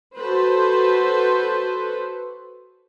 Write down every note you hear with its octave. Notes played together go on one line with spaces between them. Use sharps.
F#4 A4 B4 C5